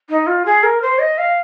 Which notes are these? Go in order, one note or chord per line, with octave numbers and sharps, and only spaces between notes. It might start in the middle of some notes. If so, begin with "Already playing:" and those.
D#4
F4
G#4
A#4
C5
D#5
F5